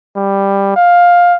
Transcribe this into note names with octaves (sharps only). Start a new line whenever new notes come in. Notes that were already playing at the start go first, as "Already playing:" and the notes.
G3
F5